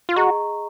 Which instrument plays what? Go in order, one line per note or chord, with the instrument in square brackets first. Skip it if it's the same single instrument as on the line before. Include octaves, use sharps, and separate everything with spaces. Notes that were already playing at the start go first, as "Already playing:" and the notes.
[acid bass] F4
[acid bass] F#4 [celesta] G#4 D#5 A#5 C#6